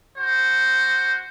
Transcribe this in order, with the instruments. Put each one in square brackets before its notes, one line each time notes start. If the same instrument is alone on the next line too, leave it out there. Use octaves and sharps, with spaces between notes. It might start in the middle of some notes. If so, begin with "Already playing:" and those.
[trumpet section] F#4 C5